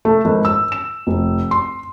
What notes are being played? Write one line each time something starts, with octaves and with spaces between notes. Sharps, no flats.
A3
G#1
E6
E7
F1
C6